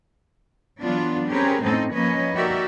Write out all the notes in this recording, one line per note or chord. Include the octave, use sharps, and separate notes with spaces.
E3 F#3 B3 D4 F4
C4 C#4 G4 G#4 A#4 B4
A2 C4 C#4 D#4 A4 D#5
F3 A#3 C#4 B4 C#5 D#5
D#4 F#4 G4 A#4 D5 E5